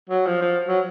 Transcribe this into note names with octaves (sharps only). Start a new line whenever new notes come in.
F#3
F3
F3
F#3